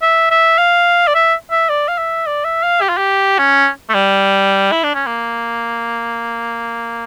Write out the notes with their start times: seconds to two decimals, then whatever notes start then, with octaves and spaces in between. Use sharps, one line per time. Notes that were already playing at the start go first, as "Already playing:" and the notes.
0.02 E5
0.31 E5
0.59 F5
1.08 D5
1.15 E5
1.52 E5
1.70 D5
1.88 F5
1.98 E5
2.27 D5
2.45 E5
2.64 F5
2.82 G4
2.90 F4
2.97 G4
3.39 C#4
3.90 A3
3.94 G3
4.72 E4
4.84 D4
4.95 C#4
5.07 A#3